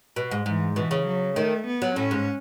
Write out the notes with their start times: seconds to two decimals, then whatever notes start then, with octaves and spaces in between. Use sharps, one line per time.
0.16 B2
0.31 G#2
0.46 G#2 E3
0.76 B2 E3
0.91 C#3
1.06 F#3
1.36 D#3 A3
1.67 B3
1.82 F#3
1.96 A2 C#4
2.11 G#2